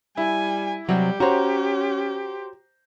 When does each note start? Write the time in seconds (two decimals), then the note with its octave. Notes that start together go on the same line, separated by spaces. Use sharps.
0.17 G3 E4 G#5
0.89 C3 F#3 G3 G4
1.20 C#4 F#4 C5 C#5 A#5